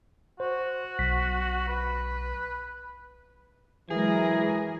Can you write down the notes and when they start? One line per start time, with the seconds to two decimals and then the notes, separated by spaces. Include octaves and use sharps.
0.40 F#4 C5
0.99 B1 B6
1.68 B4
3.90 E3 F#3 G#3 G#4 A#4